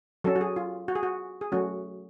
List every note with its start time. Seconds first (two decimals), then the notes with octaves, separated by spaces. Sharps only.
0.24 F#3 C#4 A4
0.36 F#4
0.41 G#4
0.56 F4
0.88 F#4
0.95 G#4
1.03 F#4
1.41 G#4
1.52 F#3 A3 C#4 F#4